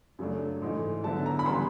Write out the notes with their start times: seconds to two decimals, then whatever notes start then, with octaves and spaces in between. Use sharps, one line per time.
0.19 F#2 C#3 F#3 A3 D4
0.62 G#2 E3 A3
1.03 D3 F#3 B3 E4 A5
1.26 A#5
1.39 B5
1.46 C#3 E3 G3 B3 C6